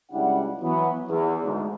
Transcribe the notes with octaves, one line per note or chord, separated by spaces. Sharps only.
C#2 G3 D4 E4 F#5
E3 F#3 B3
E2
D2 G#2